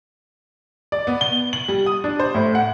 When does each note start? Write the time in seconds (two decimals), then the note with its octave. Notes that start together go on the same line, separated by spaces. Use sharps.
0.92 D5
1.07 B3
1.21 G7
1.53 F#7
1.68 G3
1.86 D#6
2.04 D4
2.20 C5
2.34 A2
2.55 F#5